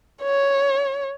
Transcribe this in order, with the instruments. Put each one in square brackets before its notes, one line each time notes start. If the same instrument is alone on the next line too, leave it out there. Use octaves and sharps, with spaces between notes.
[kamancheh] C#5